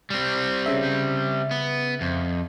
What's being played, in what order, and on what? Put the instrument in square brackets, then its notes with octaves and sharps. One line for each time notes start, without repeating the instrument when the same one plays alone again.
[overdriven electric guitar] G3 C4
[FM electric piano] C#3 E5
[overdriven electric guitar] B3
F2